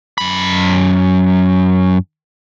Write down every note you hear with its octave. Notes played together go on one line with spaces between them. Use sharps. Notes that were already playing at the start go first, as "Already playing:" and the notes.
F#2 B5